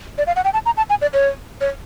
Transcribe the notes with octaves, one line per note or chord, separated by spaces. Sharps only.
D5
F5
F#5
G5
A5
A#5
A5
G#5
D5
C#5
C#5